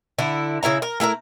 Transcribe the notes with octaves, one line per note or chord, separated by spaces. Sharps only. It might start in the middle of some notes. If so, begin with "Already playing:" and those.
D3 E4
C#3 E4 E5 A#5
A#4
A3 E4 A#4 A#5